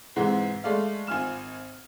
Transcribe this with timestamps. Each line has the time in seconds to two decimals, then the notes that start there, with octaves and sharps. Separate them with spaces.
0.16 G#2 C3 E3 G#3
0.64 G#3 A3 D5 F5
1.07 G#1 F4 G#5 F6 E7